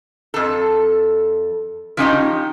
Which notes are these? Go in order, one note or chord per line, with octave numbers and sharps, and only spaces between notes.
F2 A4
F3 C#4 D#4 G4